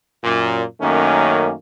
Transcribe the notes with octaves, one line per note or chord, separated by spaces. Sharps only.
F#2 A#2
F#2 D#3 A3 A#3 C#4